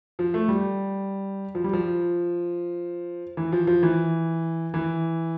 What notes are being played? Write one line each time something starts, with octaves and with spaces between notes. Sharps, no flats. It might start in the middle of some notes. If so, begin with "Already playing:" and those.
F3
A3
G3
F3
G3
F3
E3
F3
F3
E3
E3